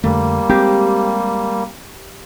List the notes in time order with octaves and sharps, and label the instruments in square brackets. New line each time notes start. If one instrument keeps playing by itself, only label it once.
[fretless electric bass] F2 D3 A3 [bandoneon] G3 A#3
[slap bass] G#3 [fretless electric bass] C4 [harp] G4